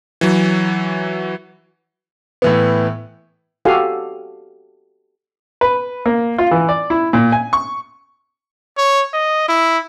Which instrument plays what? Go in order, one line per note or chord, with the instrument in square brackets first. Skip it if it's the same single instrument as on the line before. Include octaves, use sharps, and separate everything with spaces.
[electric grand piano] E3 F#3
[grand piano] A2 E3 B3
[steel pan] F#4 G4 A4 F5 G#5
[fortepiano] B4
A#3
F4
E3
D5
E4
A#2
G#5
C#6
[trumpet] C#5
D#5
E4